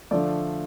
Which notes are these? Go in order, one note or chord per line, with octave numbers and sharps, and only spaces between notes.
D3 F3 A3 D5